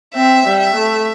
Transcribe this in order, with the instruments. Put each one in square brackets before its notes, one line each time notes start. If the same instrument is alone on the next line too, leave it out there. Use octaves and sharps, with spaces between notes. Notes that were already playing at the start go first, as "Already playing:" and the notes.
[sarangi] C4 [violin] E5
[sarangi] G3
[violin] E5
[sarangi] A3